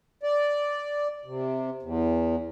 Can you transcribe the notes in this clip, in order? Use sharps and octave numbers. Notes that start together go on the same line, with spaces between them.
D5
C3
E2